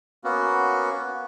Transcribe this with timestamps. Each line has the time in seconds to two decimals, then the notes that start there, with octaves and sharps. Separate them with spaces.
0.24 A#3 B3 C#4 F#4